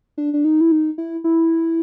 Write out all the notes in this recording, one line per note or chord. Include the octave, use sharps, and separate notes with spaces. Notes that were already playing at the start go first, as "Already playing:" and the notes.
D4
D4
D#4
E4
D#4
E4
E4